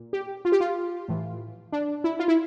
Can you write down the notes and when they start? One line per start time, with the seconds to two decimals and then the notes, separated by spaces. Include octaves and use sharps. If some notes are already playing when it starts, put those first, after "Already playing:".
Already playing: A#2
0.13 G4
0.45 F4
0.52 G4
0.60 F4
1.08 A2 E3
1.72 D4
2.04 E4
2.19 F4
2.28 E4